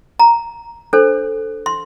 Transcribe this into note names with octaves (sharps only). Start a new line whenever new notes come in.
A#5
D4 A4 C5
C6